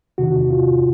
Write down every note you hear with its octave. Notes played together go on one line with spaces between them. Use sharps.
E2 C3 D#3 F#4
F4